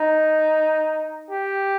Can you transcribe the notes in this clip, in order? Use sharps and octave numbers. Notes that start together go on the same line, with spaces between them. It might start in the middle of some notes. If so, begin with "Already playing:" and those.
Already playing: D#4
G4